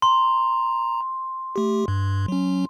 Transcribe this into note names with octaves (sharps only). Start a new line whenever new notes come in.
A#5 C6
A3 G4
G2
F#3 C#4